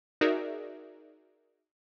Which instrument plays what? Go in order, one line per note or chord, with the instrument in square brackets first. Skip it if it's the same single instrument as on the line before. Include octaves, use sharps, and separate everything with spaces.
[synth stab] D#4 F#4 G#4 A#4 D5 E5